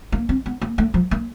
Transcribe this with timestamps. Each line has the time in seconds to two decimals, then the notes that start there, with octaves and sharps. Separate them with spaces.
0.12 A#3
0.29 C4
0.46 B3
0.61 A#3
0.78 A3
0.94 F3
1.11 A#3